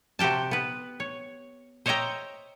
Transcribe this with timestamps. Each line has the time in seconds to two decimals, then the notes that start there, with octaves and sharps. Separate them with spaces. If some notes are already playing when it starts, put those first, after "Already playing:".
0.19 C3 F#4 G4 G5 A5
0.51 B3 B4
1.00 C#5
1.86 C5 C#5 D#5 E5 G5 A#5